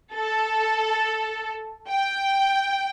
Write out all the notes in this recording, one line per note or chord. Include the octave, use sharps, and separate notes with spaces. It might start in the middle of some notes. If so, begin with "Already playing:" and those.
A4
G5